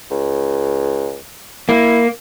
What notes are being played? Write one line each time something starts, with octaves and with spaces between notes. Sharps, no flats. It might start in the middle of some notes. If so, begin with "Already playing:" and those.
C#2
A#3 E4